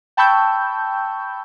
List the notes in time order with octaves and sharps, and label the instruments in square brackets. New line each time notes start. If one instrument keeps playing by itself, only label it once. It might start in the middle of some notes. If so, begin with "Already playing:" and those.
[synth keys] G5 A5 B5 C#6 E6 G6